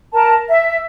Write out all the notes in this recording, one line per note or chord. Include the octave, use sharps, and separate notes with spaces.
A#4 A5
E5